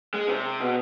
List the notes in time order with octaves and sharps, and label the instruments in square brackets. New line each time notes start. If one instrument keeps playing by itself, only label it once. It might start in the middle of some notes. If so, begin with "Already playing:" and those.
[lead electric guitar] G#3
C3
B2